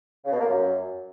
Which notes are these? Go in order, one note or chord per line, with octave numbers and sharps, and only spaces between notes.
C#3
B2
A#3
F#2